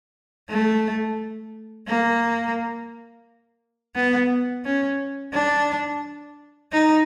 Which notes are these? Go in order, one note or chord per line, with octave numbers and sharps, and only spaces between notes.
A3
A#3
B3
C#4
D4
D#4